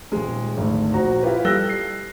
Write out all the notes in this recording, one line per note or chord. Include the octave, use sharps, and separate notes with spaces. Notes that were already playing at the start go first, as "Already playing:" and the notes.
D#1 G#3
G#1 D2
A#1 F#4 C5 A#5
E4 F4 G4 B4
G3 A4 E6 F#6 A#6 G7
C7